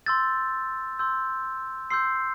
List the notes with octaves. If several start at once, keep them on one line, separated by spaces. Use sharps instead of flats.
C6 E6 G6 A6
C6 E6 G6
C6 E6 G6 C7